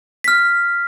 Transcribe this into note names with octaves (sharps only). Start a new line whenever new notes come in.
F6 B6